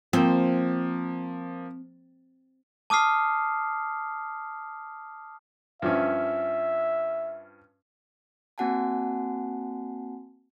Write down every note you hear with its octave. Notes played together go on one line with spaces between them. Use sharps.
F3 A#3 C4
A5 D6 D#6 F6 C7
G2 F3 C#4 E5
A#3 C4 F#4 F#5 G#5 A5